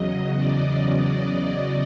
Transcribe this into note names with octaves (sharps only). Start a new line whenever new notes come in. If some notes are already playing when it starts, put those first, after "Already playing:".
Already playing: E2 C#3 F#3 D#5
D5
D#5